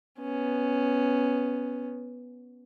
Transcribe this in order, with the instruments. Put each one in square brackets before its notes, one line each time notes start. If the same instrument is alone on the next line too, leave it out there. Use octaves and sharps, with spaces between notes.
[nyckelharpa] B3 C#4